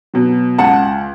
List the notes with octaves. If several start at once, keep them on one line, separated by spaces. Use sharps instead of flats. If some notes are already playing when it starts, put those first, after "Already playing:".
B2 F#3
C#2 F#5 A5